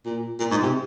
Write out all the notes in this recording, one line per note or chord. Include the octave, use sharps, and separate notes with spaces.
A#2
A#2
G#2
C3